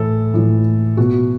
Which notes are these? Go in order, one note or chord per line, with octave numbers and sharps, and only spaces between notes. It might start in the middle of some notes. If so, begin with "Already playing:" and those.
Already playing: A2 E3 A4
A2 E3
B2 F#4